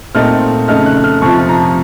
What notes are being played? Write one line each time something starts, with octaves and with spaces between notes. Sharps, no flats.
A#2 A3 C4 D#4 F6
F2 C#3 A3 D#4 F6
F#6
F6
F2 C3 F3 C#6
A#5